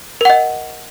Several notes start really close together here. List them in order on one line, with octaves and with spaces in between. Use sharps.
A#4 F#5 D#5